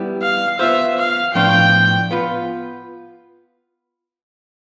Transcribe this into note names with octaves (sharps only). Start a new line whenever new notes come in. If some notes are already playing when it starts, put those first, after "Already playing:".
Already playing: G3 B3 E4
F5
B3 F4 C5 E5
F5
A2 F3 B3 D4 F4 G5
B3 F4 B4